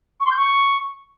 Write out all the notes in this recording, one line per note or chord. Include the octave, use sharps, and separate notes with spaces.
C#6
C6
G6
C#6